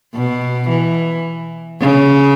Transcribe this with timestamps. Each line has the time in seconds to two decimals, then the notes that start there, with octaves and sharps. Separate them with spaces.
0.15 B2
0.69 E3
1.81 C#3